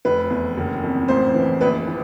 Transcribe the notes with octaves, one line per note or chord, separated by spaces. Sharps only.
F1 B4
E2
F#1
F2
A1 C5
E3
A#1 B4
E3